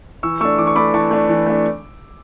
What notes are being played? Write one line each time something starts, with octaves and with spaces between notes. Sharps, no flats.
E3 C#6 E6
A3 D4 C#6 E6
E3 D6
C#6
A3 D4 B5 D6
E3 A5 C#6
A3 D4
E3
A3 D4